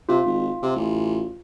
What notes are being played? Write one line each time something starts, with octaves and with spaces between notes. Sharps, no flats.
C3 F4
G#1
C3
A1